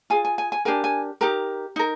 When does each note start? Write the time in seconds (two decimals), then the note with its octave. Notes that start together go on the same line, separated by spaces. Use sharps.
0.10 F4 G#4 G#5
0.25 G#5
0.38 G#5
0.52 G#5
0.65 D4 G4 A#4 G#5
0.84 G#5
1.21 D#4 G4 A#4 A#5
1.76 D#4 A#4